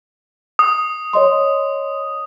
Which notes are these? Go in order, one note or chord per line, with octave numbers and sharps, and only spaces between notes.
D#6
C#5 D#5 C6